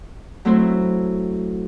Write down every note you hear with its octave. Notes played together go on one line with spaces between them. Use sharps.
F#3 A3 C4 E4 C5